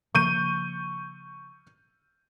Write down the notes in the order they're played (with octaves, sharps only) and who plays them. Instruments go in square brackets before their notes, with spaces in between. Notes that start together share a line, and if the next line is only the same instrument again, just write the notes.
[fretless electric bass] C#3 F3 A#3 [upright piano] C#6 G6 D#7